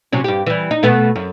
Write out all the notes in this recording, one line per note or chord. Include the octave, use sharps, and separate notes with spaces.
C3 F#3 C#4
G2 G4
E3 G3
D#4
B2 A3 B3
F#2